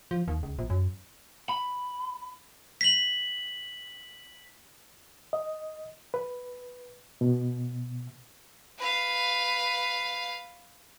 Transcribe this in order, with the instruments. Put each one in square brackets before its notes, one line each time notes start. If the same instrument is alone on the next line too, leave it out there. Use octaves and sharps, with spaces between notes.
[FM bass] F3
D#2
C#2
A#1
F#2
[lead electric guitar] B5
[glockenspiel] B6 F#7
[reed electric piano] D#5
B4
B2
[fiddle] B4 F5